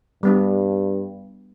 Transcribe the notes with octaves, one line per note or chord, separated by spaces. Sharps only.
G2 G3 B3 D4